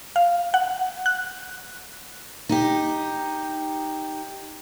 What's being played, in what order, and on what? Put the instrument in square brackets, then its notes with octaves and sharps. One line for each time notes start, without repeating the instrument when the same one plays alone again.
[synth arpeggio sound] F5
F#5
F#6
[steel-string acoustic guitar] D#4 G4